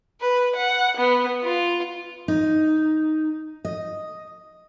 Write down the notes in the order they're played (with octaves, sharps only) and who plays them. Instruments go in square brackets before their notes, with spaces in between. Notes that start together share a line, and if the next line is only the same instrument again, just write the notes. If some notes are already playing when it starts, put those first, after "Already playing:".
[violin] B4
F#5
B3
F4
[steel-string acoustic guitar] D#4
D#5